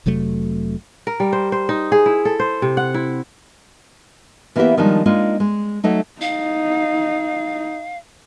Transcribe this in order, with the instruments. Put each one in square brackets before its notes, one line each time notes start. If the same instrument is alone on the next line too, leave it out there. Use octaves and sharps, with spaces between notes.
[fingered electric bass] F1 C3 F#3 A3
[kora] A#4
G3
C5
C5
D#4
G#4
E4
A4
C5
C3
F#5
E4
[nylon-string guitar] E3 A#3 B3 E4 G4 E5
D#3 F3 G3 G#3 D4 D#4
G#3 A#3 D4 D#4 F4
G#3
F#3 A3 D#4
[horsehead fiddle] D#4 [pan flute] F5